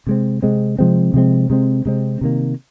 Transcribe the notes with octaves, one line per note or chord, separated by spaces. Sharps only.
C3 G#3 C4
C3 G#3 C4
C3 F3 G#3 C4
C3 F3 G#3 C4
C3 G#3 C4
C3 G#3 C4
C3 D#3 A#3